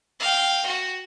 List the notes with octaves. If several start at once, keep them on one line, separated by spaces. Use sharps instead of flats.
F5 G5
F#4